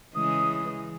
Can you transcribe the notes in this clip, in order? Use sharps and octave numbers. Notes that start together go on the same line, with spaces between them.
C#3 E3 G#3 D#6